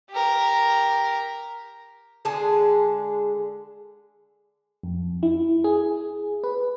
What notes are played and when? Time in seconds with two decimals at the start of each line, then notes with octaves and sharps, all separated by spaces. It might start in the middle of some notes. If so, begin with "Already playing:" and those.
0.11 G4 A#4
2.25 D3 G#3 G#4 A5
4.83 F2
5.23 E4
5.64 G#4
6.44 B4